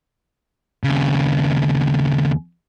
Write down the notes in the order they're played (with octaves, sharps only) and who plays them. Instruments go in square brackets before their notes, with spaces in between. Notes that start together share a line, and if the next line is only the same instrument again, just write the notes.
[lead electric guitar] D#2 C#3